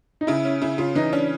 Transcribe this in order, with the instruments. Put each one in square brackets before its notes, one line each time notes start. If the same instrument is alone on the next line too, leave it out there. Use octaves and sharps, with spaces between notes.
[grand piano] D#4
[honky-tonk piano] C#3 [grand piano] E4
[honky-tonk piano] C#4
[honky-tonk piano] C#3 [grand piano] E4
[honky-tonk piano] C#3 [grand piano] F4
[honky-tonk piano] E3 [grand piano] D#4
[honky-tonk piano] C#4 [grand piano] D4